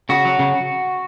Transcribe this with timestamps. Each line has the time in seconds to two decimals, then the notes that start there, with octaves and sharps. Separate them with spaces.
0.09 C#3 F#4
0.25 F#3
0.39 C#3